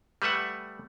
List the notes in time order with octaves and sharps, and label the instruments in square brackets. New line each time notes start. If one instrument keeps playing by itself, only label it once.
[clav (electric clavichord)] G3 A3 B4 E5 F#5